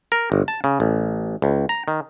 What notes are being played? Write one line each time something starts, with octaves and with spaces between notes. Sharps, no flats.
A#4
G1
A5
C#3
A1
C#2
A#5
D#3